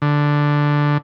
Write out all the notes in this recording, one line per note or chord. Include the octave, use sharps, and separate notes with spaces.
D3